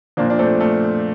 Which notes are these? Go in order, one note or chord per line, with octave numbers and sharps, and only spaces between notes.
A#2 F3 A#3 D4
D4
A3 C4
A3